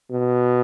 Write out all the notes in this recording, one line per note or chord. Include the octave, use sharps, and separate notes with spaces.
B2